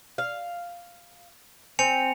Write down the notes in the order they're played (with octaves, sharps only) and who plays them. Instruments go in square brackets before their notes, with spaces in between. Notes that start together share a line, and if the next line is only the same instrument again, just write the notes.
[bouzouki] F5
[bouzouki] C4 [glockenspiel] G#5 C#7 F7